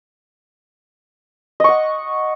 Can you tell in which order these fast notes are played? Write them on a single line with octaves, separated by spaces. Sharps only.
D#5 C#6 F#5